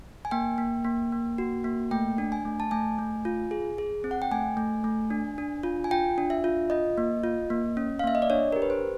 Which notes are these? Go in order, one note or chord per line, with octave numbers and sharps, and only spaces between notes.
G#5
A#3 G5
A#3
A#3
A#3
F#4
A#3
A3 G5
D4
G#5
A3
A5
A3 G#5
A3
F4
G#4
G#4
C4
F#5
G5
A3 G#5
A3
A3
D4
D4
F4
G#5
F4 G5
D4
E5
F4
F4 D#5
A#3
F4
A#3
C#4
F5
A#3 E5
D#5
D5
D4 C#5
A#4
G4
B4
C5